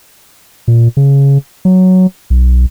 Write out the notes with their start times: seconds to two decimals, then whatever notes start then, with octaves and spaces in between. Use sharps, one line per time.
0.68 A#2
0.97 C#3
1.65 F#3
2.30 B1